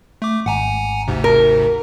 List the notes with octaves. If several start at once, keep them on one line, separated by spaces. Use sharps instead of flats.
A3 D6
G#1 F#5 G#5 A#5
D2 G#2 C3
A#4